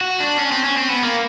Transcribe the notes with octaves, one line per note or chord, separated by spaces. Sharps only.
F#4
D4
C#4
C4
C#4
C4
B3
A#3